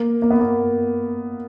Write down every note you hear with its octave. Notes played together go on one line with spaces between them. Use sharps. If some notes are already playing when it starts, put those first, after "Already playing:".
Already playing: A#3
A#3
B3
A#3